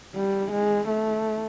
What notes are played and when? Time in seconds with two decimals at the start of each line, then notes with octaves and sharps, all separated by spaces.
0.16 G3
0.52 G#3
0.89 A3